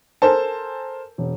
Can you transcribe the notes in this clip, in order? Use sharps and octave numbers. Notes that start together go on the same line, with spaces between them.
A4 A#4 C5 G#5 A5
E1